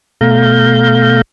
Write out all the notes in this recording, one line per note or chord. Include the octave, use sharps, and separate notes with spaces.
B2 A3 F5 A#5 G6